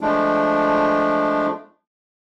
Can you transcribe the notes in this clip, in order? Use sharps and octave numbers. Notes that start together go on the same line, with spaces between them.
F3 G#3 A3 D4